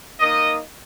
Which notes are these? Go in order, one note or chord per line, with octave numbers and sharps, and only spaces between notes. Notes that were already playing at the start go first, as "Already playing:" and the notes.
D#3 A#3 D#4 D#5